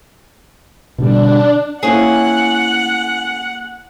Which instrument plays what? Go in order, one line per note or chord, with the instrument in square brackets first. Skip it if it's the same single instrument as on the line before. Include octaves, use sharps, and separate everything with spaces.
[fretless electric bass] B2 D3 G3 [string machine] D4
[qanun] A#3 C#4 E4 [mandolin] G#4 [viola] F#5